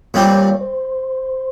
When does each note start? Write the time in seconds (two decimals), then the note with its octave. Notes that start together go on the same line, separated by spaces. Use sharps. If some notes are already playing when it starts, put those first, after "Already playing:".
0.14 A#2 G3 C4 C#5
0.61 C5